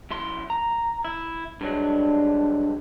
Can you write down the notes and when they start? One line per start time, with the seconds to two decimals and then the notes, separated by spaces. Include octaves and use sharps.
0.10 F#2 E4 C6
0.50 A#5
1.04 E4
1.61 G2 F#3 G#3 D4